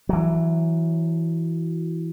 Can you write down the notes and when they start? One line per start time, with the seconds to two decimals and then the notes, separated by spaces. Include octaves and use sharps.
0.09 E3 F#3